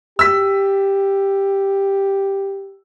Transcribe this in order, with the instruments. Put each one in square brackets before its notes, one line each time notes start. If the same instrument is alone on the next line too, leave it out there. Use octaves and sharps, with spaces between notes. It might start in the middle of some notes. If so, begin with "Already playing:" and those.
[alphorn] G4 [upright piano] E6 B6